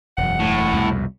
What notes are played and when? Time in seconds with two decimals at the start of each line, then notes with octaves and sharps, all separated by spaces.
0.18 E1 F#2 F#5
0.40 A2
0.73 C2 F2 B2